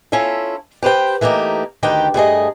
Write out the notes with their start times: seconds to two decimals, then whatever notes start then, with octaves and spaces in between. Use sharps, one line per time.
0.12 C#4 E4 F4 A4
0.83 G4 B4 C5 G5
1.21 E3 A3 A#3 D#4 G4
1.83 D2 D#3 G4 B4 G5
2.14 G2 A3 G#4 D#5